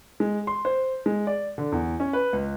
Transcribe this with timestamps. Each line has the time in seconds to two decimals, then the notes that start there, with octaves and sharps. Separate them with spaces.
0.20 G#3
0.47 C6
0.65 C5
1.06 G#3
1.27 D5
1.58 D3
1.72 E2
2.00 C#4
2.13 B4
2.33 C#2